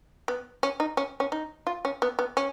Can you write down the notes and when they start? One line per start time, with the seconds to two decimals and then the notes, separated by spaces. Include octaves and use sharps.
0.28 B3
0.63 C#4
0.80 D#4
0.97 C#4
1.20 C#4
1.32 D#4
1.67 F4
1.85 C#4
2.02 B3
2.19 B3
2.37 C#4